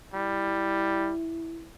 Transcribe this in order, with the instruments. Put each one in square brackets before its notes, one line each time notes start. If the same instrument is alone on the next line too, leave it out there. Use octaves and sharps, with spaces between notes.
[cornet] G3 [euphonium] E4